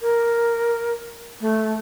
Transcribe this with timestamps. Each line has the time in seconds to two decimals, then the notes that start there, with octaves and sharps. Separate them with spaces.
0.01 A#4
1.41 A3